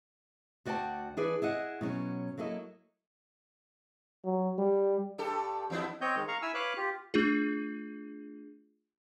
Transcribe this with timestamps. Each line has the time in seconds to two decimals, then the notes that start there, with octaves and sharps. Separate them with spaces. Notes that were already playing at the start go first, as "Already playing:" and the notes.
0.65 D2 F#4 D5 F#5 G5 A5
1.17 E3 D4 G#4 B4 D5
1.42 E4 G#4 D#5 F#5
1.81 B2 F#3 C#4
2.38 F#3 A#3 E4 A4 D#5
4.24 F#3
4.58 G3
5.18 G2 G4 A4
5.70 E2 B3 E4
6.01 C4 C#5 D#5 G6
6.16 D#3 G#3
6.28 F5 A#5 C#6
6.42 E4 G#5 E6
6.54 B4 C#5 F5 D6 F#6
6.77 F4 G4
7.14 A3 D4 F4 G#4